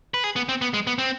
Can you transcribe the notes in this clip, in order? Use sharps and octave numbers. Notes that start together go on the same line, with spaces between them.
B4
G#4
B3
C4
B3
G#3
B3
C4